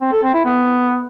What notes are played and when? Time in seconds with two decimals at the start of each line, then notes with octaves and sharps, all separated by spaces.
0.01 C4
0.12 A4
0.23 C4
0.34 E4
0.45 B3